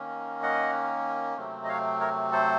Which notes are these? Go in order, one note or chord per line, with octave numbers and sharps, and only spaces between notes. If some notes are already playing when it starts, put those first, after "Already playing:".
Already playing: D#3 A#3 C#4
D#5 F#5
C3 F#3 A3 C4
D#5
C#5 F5
A#4 C#5
A4 C5